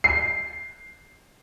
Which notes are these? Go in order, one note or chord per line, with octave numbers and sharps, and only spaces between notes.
C7